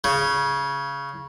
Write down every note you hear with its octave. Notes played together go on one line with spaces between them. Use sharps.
C#3